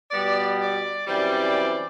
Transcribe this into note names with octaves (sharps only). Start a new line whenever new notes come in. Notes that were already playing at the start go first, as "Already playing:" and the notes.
B2 G3 B3 D5
D5
F#2 E3 G3 C4 D5